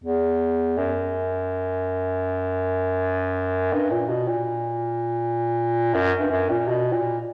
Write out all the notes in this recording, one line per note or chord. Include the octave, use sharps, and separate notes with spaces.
E2
F#2
G2
A#2
B2
A#2
F#2
G2
F#2
A#2
B2
A#2